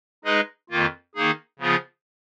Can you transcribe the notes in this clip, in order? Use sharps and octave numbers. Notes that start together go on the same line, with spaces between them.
G#3 D#4 G#4 B4 D#5
F2 D#3 A#3 F4
D#3 A#3 D#4 G#4
C#3 F3 B3 F4 G#4